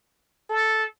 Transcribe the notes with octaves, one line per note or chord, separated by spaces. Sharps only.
A4